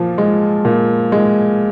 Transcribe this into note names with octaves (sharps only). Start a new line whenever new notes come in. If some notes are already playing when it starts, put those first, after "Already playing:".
Already playing: A#2 F3
G#3
A#2
G#3